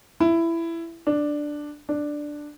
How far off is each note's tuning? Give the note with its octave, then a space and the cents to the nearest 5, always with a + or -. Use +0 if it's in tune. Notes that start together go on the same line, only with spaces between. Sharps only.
E4 +15
D4 +5
D4 +5